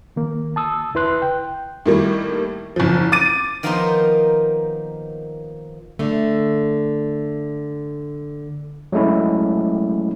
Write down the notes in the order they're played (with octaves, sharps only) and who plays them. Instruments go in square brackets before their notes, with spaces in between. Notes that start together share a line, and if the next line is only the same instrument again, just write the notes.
[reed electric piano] D#3 A#3
A5 D#6 E6
D#2 E4 B4 C6 F#6
G5
[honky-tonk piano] A2 D#3 G3 A#3
F#1 F3
D6 A6 D#7
[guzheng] D#3 F3 A#3 B3 D#4 C5
[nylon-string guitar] D3 A3
[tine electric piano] F#3 G#3 A3 C#4 E4